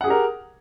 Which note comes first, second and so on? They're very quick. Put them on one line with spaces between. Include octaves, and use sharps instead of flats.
F#5 G#4 G4 A#4